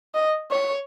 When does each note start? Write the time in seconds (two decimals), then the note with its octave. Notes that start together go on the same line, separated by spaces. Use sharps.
0.15 D#5
0.51 C#5